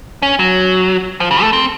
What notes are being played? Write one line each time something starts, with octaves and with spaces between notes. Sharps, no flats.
C#4
F#3
F3
C#3
A3
C4